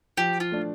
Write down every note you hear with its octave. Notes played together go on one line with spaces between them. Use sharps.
F3 G4
F4
A3 D4